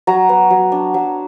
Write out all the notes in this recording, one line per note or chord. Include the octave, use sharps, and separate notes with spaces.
F#3 A#5
B3
F#3
D4
F#3